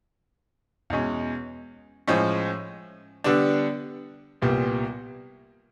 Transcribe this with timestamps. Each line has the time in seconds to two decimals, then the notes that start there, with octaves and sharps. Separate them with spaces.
0.90 E2 B2 G#3 C#4
2.08 A2 F3 G#3 C#4
3.24 D3 G3 B3 D4
4.42 C2 A#2 G3 B3